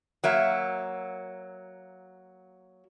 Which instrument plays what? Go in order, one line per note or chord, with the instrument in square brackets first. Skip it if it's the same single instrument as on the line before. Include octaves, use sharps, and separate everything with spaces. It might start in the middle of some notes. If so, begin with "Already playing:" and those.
[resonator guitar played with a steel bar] F#3 A#3 E5